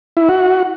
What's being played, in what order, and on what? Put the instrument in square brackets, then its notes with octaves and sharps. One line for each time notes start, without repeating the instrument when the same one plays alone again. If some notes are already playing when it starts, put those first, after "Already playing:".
[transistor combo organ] E4
F#4